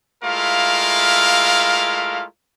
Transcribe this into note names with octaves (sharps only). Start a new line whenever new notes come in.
G#3 A3 E4 F4 A#4 F5